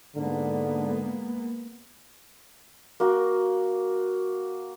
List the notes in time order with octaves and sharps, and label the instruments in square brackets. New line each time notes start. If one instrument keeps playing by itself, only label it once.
[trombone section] G#2 D3 [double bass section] G#3 A#3 B3
[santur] A#3 F#4